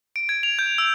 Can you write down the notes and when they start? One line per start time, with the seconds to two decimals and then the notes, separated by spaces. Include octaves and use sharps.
0.16 D7
0.29 G#6
0.43 F7
0.59 G6
0.78 E6